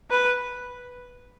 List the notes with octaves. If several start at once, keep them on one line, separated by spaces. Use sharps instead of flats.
B4